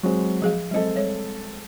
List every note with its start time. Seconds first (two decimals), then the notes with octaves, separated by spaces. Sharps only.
0.03 F#3 G#3 C4
0.42 F3 G#4 F5
0.71 F#3 G#3 C4 A4 D#5
0.96 G3 C#5